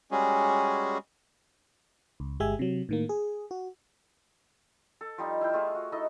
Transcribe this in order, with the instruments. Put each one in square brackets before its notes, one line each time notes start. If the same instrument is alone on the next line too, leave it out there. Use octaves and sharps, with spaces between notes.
[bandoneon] G3 G#3 C#4 F#4 G#4
[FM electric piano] C#2
G1 G#3 G4 E5 G#5
C3 F#3
A2 D#3 A#3
G#4
F#4
[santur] A4
F3 G3 D#4
E4 F5 G5
A3 F4 G#4 A5
F#4
D#4 E4 A4 D#5